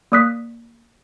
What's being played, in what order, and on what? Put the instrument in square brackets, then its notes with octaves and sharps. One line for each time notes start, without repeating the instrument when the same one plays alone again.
[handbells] A#3 D5 D#6 F#6 B6